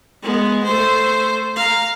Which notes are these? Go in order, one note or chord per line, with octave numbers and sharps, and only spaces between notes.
G#3 B3
A3 C5
F5 A#5